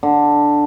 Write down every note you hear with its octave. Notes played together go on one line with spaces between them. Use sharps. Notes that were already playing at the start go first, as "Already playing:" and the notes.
D3